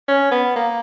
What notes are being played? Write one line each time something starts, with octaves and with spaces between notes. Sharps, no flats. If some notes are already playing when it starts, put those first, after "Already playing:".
C#4
B3
A#3